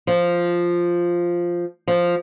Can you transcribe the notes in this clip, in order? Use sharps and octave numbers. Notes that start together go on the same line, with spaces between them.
F3
F3